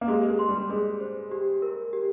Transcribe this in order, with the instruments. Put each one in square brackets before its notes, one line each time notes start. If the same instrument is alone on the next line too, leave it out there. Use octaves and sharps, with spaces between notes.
[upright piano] A#3
[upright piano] G#3 [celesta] G4
[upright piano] G#3
[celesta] C6
[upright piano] G3
[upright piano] G#3 [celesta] G#4
[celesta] C5
G4
A#4
G4